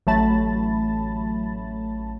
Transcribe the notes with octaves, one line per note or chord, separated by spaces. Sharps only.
A1 F#3 A3 A5 B5 A6